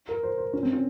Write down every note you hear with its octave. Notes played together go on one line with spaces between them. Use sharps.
A#4
C5
C5
C#4
C4
C#4